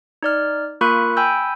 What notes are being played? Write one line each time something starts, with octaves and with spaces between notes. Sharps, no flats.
D#4 D5 F6
A#3 F4 A#4 B5 C#6 F#6
G5 G#5 B5 E6 G6